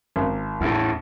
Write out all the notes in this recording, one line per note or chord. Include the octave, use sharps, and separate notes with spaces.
G#1
E2 A2